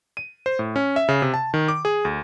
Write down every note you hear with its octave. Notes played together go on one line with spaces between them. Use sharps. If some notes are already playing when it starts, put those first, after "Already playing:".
D#7
C5
A2
C#4
E5
C#3
C3
A5
D#3
D6
G#4
D2